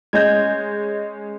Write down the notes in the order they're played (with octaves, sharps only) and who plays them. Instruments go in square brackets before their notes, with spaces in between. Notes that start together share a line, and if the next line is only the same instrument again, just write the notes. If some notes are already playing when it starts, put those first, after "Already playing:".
[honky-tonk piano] G#3 C#4 G6 [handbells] D#5 G#6